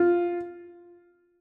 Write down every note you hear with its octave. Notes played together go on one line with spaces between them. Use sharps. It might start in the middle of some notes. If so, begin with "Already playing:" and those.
Already playing: F4